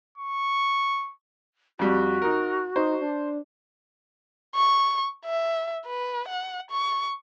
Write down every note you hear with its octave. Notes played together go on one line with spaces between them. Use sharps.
C#6
F2 G3 F#4
D#4 A#4
D#4 C5
D4
C#6
E5
B4
F#5
C#6